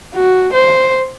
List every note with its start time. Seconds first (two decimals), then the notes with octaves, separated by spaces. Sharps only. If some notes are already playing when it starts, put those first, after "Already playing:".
0.14 F#4
0.53 C5